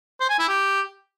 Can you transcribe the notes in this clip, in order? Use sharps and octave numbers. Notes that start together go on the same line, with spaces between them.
C5
G#5
E4
G4